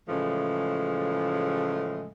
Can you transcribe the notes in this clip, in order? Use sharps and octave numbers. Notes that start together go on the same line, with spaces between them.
A2 C#3 E3 F3 G#3 A3